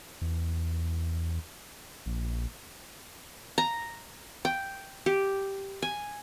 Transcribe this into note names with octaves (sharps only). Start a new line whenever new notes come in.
E2
A#1
A#5
G5
G4
G#5